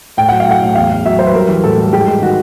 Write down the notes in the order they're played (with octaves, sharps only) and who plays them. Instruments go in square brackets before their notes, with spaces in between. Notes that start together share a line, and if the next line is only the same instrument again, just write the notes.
[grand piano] A2 G5
F#3 F#5
F5
A2 F#5
A2
E2 F5
E2
F#3 E5
F#3 C5
B4
G3 A#4
E3
A2 A4
G3
G#2 G4
G#3
D#3 F#4